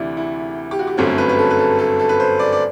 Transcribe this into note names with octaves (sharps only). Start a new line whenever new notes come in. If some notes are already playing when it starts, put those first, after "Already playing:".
Already playing: D2 C3 E3 E4 D5
E4
G4
F#4
G4
G1 F#2 F#3 A3 C4
B4
B4
A4
B4
A4
A4
A4
B4
C5
D5
D5